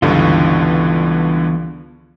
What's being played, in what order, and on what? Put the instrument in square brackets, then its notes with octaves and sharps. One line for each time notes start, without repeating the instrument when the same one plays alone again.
[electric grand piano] C#2 G2 D3 [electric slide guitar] E3 B3 F4